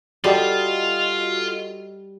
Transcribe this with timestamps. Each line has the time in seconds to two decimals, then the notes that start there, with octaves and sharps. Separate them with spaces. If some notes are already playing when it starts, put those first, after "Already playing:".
0.24 G3 F4 F#4 A4 D#5